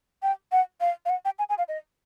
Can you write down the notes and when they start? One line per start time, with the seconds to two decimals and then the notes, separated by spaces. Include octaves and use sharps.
0.23 G5
0.52 F#5
0.81 F5
1.05 F5
1.09 F#5
1.25 G5
1.39 G#5
1.49 G#5
1.58 F5
1.68 D#5